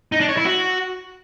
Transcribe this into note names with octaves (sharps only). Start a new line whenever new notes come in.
D#4
D4
C#5
E4
F#4